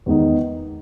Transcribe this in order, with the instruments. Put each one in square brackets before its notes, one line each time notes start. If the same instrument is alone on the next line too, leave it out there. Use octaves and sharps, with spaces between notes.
[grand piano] E2 D#3 G#3 D#4